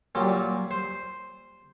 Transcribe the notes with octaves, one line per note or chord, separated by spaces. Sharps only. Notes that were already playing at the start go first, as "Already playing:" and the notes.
A#2 F#3 G3
C5